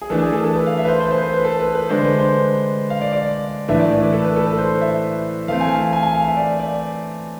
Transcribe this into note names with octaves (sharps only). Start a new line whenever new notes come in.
G#4
E3 A3 D4 A4
G#4
A4
A4
B4
F5
E5
B4
C5
C5
C5
B4
B4
A4
B4
B4
D3 G#3 D4 C5
B4
C5
F5
D5
D5
A2 E3 A3 D4 E5
D5
D5
B4
A4
B4
A4
B4
C5
E5
E3 A3 C4 F5
G#5
F5
G#5
G#5
F5
E5
D5
D5